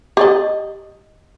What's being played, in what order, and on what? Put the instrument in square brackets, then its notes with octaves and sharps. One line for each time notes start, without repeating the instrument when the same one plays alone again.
[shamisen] G4 D5 D#5